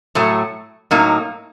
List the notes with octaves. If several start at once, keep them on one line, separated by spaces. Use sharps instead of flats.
A2 F#3 A3
A2 F#3 A#3 D#4